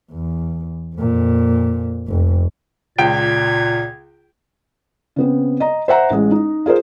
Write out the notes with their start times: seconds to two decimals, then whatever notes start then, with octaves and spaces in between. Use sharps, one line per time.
0.12 E2
0.95 F2 A#2
2.08 F1 F2
2.98 C#2 A#2 G5 G#6 D7
5.16 C#3 B3 C4
5.60 D#5 A#5
5.88 C5 E5 F#5 A#5
6.10 A1 G#3
6.31 D#4
6.66 F4 G#4 A#4 C5